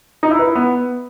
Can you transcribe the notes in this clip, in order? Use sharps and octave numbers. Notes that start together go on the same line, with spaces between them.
D#4
E4
B4
E4
B3